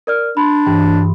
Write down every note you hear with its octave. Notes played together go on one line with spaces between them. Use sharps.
A#4 D5 F6
D4 B5 C6
G2 E3 G5